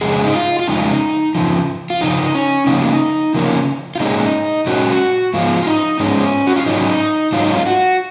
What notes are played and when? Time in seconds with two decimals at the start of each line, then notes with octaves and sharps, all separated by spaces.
0.01 F2 C#3 G#3 C#4 G#4
0.24 D#4
0.35 F4
0.59 F4
0.67 F2 C#3 G#3 C#4 D#4
1.35 F2 C#3 F3
1.90 F4
2.01 F2 C#3 F3 D#4
2.35 C#4
2.67 C#3 F3 A#3 C#4 D#4
3.35 C#3 F3 A#3 C#4
3.96 F4
4.00 A#2 G#3 C#4 D#4
4.67 A#2 G#3 C#4 F#4
5.34 G#2 F3 G#3 B3 F4
5.63 F4
5.66 D#4
6.00 G#2 F3 G#3 B3 C#4
6.47 F#4
6.56 F4
6.66 G#2 F#3 C#4 D#4
7.32 G#2 F#3 C#4 F4
7.42 D#4
7.52 F4
7.66 F#4